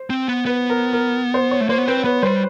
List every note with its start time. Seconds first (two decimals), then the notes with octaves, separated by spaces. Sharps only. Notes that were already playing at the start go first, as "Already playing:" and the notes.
Already playing: C5
0.10 C4
0.28 B3
0.45 B3 B4
0.70 A#4
0.93 A#4
1.34 C5
1.51 C#5
1.61 A3
1.69 A#3 C5
1.78 B3
1.88 C4 B4
2.04 B3 B4
2.23 G3 C5